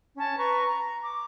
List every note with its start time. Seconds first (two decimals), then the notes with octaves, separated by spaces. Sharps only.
0.16 C#4 C#5 A5
0.38 B4 A#5 C#6
0.66 A#5
1.02 D6